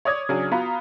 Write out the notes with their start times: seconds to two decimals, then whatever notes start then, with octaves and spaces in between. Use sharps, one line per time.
0.05 C#5 D5 D#6 G#6
0.29 C#3 F#3 D4 G#4
0.52 B3 F4 F#4 A#5 B5